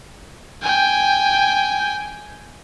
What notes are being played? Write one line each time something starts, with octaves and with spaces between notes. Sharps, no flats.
G5 G#5